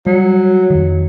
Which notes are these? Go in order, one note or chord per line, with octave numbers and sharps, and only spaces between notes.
F#3 G3
F2 D#3